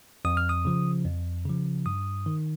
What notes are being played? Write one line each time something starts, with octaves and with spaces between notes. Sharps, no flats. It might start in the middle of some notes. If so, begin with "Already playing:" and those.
F2 D#6
F6
D#6
C#3 F3
F2
C#3 F3
G2 D#6
D#3